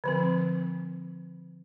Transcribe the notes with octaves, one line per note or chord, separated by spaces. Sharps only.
D3 F3 C4